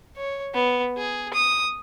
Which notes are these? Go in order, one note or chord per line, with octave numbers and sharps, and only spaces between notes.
C#5
B3
G#4
D#6